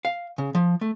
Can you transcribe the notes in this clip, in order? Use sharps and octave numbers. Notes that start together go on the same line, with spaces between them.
F5
C#3
F3
A3